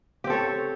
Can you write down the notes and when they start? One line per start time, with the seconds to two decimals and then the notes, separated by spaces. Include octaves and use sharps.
0.24 G4
0.27 C4
0.30 A4
0.33 C#5